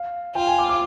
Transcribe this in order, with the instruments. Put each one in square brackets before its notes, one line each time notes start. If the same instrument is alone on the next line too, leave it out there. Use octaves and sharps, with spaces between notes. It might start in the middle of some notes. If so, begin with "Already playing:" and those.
Already playing: [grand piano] F5
[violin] F4 [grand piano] G5
[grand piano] G#5
D6
D6